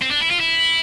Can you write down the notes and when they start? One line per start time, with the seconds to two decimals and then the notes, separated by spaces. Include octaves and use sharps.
0.02 C4
0.11 D4
0.21 E4
0.31 F4
0.40 E4